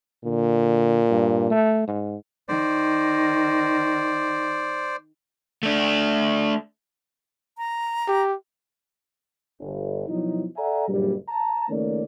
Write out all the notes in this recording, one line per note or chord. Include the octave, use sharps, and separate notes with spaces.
A#2 D3
G2
A3
G#2
D#3 C5 D5
A3 D4
A#5
G4
G1
B2 F3 F#3 D#4 E4
A4 D5 E5 F#5 G#5 A#5
F#1 G2 A#2 F#3 G3
A5 A#5
C#2 D#3 A3 A#3 C#4 D5